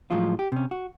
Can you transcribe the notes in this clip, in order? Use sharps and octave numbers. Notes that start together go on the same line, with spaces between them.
A2 F3 F#3 G#3 F4
G4
C3 C#4
F#4